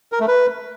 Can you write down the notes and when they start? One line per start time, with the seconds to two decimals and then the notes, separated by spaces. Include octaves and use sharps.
0.12 A#4
0.20 A3
0.28 B4